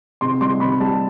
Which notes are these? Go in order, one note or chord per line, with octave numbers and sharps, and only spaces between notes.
C3 C6
G3 C6
C3 B5
G3 A5